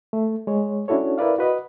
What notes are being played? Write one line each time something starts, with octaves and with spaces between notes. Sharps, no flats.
A3
G#3 C#5
C#4 D4 E4 F#4 A4 C#5
E4 A#4 B4 D5 F5
F#4 B4 D#5